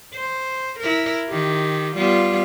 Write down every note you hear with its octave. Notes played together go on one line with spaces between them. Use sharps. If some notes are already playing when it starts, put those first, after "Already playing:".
C5
E4 A#4
D#3 G4
G3 B3 F4